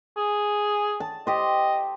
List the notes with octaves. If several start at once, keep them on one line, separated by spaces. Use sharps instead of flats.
G#4
A5
G4 C5 D#5